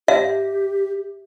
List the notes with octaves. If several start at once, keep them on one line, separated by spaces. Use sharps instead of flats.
G4 E5